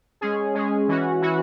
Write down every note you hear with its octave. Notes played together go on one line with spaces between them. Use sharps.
G#3 C#4 G#4
G#3 C#4 G#4
E3 C#4 F#4
E3 C#4 F#4